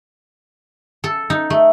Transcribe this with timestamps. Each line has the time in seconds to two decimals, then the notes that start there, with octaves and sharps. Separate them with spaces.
1.04 A4
1.30 D#4
1.50 A3